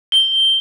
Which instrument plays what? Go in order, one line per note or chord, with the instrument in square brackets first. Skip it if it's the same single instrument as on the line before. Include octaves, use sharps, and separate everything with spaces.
[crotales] G7